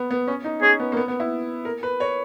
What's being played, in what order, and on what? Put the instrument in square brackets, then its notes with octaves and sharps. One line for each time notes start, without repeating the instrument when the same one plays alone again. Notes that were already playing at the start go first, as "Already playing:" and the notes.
Already playing: [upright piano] B3
B3
C#4
D#4
[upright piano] C#4 [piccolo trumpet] G#4
[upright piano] B3
A#3
B3
B3
E4
A#4
B4
C#5